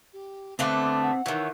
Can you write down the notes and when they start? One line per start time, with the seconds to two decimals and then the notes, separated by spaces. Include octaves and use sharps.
0.13 G4
0.59 D3 A3 B3 C4 D6
1.02 F#5
1.26 D#3 E3 C#5